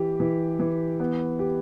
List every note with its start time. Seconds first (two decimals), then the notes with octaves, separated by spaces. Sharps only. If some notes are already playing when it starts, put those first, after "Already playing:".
Already playing: E3 G4
0.20 E3
0.59 E3
1.00 B3
1.39 G4